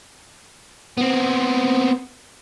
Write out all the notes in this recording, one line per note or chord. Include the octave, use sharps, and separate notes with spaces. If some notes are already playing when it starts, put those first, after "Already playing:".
B3 C4